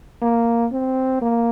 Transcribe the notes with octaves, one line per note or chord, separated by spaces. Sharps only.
A#3
C4
A#3